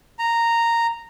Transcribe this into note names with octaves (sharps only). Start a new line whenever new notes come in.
A#5